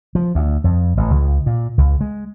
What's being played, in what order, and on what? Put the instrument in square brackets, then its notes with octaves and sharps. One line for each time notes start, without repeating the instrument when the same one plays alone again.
[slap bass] F3
D2
F2
A1
C#2
A#2
C#2
G#3